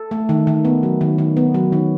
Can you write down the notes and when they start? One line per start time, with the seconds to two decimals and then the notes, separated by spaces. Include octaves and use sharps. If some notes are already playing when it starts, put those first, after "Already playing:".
Already playing: A4
0.11 A3
0.29 D#3
0.47 D#3
0.65 B3
0.83 F#3
1.01 D#3
1.18 D#3
1.37 B3
1.54 F#3
1.72 D#3